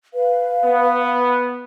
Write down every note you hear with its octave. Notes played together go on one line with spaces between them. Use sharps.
B4 F5
B3